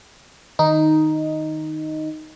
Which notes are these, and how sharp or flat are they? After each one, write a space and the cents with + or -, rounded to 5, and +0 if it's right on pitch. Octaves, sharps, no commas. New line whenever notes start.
D#3 -5 D#4 +0